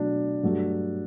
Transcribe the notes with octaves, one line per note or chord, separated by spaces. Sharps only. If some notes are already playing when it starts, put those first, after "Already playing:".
Already playing: B2 F#3 A3 D4
G2 F#3 A3